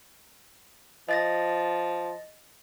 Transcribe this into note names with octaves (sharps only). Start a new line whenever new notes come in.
F3 D#5 A6 A#6